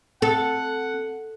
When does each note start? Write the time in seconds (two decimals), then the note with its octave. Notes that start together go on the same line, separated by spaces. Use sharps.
0.22 C4 A4 F#5